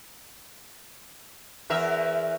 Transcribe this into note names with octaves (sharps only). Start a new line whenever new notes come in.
E2 A#4 E5